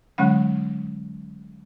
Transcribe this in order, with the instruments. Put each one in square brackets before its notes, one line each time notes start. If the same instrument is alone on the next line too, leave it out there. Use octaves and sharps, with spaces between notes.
[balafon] D3 F#3 G#3 C#4 F#5